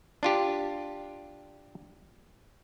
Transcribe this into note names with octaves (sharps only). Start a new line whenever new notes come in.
D4 F4 G4